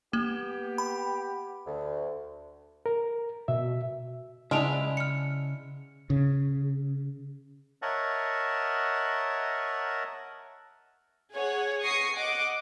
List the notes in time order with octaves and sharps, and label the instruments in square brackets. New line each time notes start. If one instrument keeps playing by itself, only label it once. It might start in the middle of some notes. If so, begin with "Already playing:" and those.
[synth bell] A#3 [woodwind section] B3 G4
[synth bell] B5
[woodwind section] D2
[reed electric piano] A#4
[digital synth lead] B2 [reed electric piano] E5
[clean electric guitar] C#3 F#5 [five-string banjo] G#3 D4 E4 [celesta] F6 D7 F7
[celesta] F6 C#7
[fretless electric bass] C#3
[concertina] A#4 C#5 D#5 E5 F#5 A5
[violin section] G#4 C#5 F#5
C#6 D#6 A#6 C7 C#7
D#5 F#5 D6